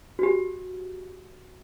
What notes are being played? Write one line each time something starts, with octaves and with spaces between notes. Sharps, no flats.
F#4 G4